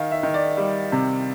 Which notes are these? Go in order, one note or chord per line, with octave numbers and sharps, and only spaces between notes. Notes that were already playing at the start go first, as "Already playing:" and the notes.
Already playing: D#3 F5
E5
D#3
D5
G3
C3